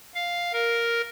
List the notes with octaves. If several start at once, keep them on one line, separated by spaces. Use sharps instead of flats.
F5
A#4